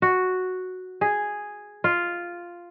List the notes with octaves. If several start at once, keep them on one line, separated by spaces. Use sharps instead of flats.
F#4
G#4
F4